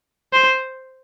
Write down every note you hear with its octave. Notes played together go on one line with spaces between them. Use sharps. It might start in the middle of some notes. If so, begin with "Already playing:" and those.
C5